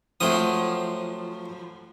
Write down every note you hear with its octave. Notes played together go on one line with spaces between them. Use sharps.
F3 F#3 A3 C4 D#6